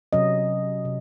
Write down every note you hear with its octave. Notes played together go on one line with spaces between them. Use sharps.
C3 F#3 C#4 D#5
C3